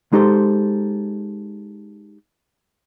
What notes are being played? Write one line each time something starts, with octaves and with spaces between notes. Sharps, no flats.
G#3 D#4 G4 A4 C5